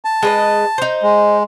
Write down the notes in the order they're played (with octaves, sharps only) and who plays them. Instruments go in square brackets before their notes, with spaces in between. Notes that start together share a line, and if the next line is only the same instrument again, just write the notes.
[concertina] A5
[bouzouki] G#3 B4 D#5
D#4 C5
[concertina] G#3